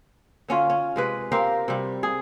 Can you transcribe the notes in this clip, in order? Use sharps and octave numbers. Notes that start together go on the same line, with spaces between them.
D3 C#4 F4
C#4
C3 G#3 B4
C4 G4 A#4 F5
C3 G3
G#4